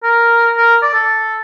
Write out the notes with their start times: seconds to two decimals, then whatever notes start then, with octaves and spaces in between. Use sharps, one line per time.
0.03 A#4
0.57 A#4
0.82 D5
0.94 A4